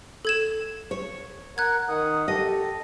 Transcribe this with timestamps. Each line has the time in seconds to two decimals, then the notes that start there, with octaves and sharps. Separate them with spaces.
0.25 A4 G#6 E7
0.91 C#5
1.58 A#4 F#5 F#6 G#6
1.89 D#3 F#5 D#6
2.28 G4 A4 D#5